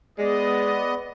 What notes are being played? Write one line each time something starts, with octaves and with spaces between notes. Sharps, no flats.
G#3 B3 D5 D#5